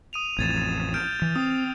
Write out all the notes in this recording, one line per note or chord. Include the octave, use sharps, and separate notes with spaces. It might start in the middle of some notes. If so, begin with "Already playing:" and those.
D#6 D#7 F7
A1 F2 G#6 A6 E7
F6 G6 D7
E3
C4 D#6